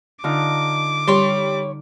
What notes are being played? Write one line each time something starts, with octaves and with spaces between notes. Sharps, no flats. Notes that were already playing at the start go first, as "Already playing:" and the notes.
D3 D#4 F4 D6
G3 C#5 C6